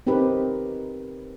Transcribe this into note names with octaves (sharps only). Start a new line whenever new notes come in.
C4 D#4 G4 A#4 B4